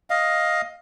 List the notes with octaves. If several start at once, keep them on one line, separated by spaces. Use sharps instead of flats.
D#5 F5